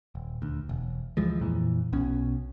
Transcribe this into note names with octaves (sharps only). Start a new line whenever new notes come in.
D#1
D2
E1
D2 E3 F3 G#3
F2 A#2 E3
B1 B2 C#4